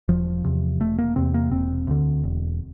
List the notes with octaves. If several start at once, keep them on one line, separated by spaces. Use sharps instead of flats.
E1 F3
E2 C3
E1 A3
A#3
E2 C3 C4
A#3
E1 C4
D2 D3
E1